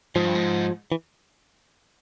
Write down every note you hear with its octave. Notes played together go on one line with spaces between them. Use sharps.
G#2 F3
G2
G#2
E3